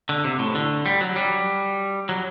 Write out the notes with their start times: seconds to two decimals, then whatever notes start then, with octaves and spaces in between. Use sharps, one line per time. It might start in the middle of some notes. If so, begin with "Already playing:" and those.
0.09 D3
0.24 C3
0.39 A2
0.55 D3
0.86 G3
1.01 F#3
1.16 G3
2.09 F#3